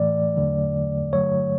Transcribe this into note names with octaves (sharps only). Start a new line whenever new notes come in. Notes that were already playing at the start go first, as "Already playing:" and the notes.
Already playing: A2 E3 A3 D5
E2 D3 F#3 A3
G2 D3 F#3 A3 C#5